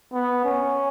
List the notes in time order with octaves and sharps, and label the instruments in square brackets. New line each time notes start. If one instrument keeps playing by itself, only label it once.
[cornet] B3
C#4